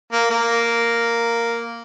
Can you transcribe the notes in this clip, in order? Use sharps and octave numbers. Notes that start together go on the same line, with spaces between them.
A#3
A#3